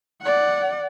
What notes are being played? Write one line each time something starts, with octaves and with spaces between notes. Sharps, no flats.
D5 F#5